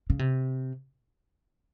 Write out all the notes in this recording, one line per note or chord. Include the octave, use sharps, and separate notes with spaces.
C#3
C3